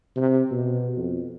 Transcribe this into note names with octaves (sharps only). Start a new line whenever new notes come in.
C3
B2
F2